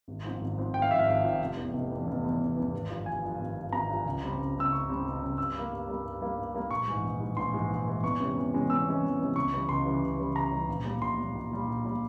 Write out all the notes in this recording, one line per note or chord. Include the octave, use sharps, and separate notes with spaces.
G#1
G#2 F3 C4
G#1
G#2 F3 C4
G#1 G5
F5
G#2 F3 C4 E5
F5
G#1
G#2 F3 C4
F1
E2 E3
F1
E2 E3
F1
E2 E3
F1
E2 E3
G#1
G2 F3
G#1 G#5
G2 F3
G#1
G2 F3
G#1 A#5
G2 F3
C#2
C#3 G3 C4
C#2
C#3 G3 C4 E6
C#2 C#6
C#3 G3 C4
C#2
C#3 G3 C4
G2 E6
G3 A#3
G2
G3 A#3
G2
G3 A#3
G2
G3 A#3
A#1 C#6
G#2 E3 G#3
A#1
G#2 E3 G#3
A#1 C6
G#2 E3 G#3
A#1
G#2 E3 G#3
E2 C#6
C3 E3 G#3 C#4
E2
C3 E3 G#3 C#4
E2 E6
C3 E3 G#3 C#4
E2
C3 E3 G#3 C#4
C#2 C#6
C#3 E3 G3
C#2 C6
C#3 E3 G3
C#2
C#3 E3 G3
C#2 A#5
C#3 E3 G3
A#1
A#2 G3
A#1 C6
A#2 G3
A#1
A#2 G3
A#1
A#2 G3